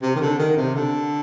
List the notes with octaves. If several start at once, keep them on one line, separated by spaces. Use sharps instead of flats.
C3
D#3
D3
D#3
C3
D3